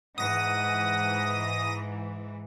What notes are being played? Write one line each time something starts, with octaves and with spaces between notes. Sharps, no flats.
G#2 E3 F#5 D#6 A#6